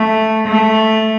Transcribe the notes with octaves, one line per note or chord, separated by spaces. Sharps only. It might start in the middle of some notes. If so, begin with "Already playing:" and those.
Already playing: A3
A3